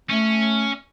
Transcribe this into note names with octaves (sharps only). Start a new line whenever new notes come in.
A3 C#4